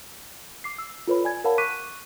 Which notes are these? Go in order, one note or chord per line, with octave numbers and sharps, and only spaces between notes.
D6 C7
E6
F4 A4 B4 C#5 B5
D5 G#5 G#6
A#4 C#5 F5 F#5 A5 B5
C#6 D6 F#6 B6 D#7